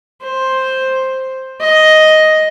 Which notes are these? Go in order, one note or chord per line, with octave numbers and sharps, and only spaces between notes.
C5
D#5